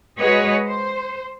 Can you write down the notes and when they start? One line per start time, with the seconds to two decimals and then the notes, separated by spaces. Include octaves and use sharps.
0.20 G#3 F#4 G#4 B4 C#5 D#5
0.67 C5